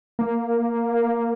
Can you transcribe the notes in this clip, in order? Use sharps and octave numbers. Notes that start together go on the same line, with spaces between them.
A#3